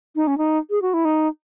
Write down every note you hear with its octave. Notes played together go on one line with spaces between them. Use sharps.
D#4
C#4
D#4
G#4
F#4
E4
D#4